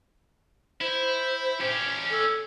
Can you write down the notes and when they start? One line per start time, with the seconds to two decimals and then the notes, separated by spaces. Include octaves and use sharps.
0.81 E4 C5
1.61 C#4 G4
2.11 A4